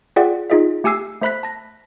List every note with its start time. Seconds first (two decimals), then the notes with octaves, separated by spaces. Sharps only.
0.16 F4 G#4 D5 E5 F#5 G5
0.50 D#4 F4 G#4 D#5 E5
0.84 A3 G4 G#5 E6 C7
1.21 A3 C5 E5 B5 F#6 B6
1.43 A5 A#6